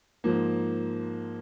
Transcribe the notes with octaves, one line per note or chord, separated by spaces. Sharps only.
G#2 F3 A#3